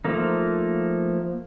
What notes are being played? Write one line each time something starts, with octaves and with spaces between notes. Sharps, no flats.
F3 A3 A#3 D#4